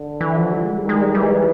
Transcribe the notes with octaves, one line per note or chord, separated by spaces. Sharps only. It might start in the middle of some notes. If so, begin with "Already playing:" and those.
Already playing: D3
E3
F3
G3
G#3
G3
D#3
G#3
G3
E3 G3
G#3
G3